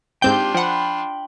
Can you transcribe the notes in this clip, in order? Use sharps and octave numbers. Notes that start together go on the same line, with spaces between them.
G#2 C4 D4 F4 G4 G5 G6
F3 F#5 G5 B5